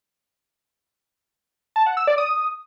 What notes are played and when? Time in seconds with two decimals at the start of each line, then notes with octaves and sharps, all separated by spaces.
1.76 A5
1.86 F#5
1.97 E6
2.07 D5
2.18 D#6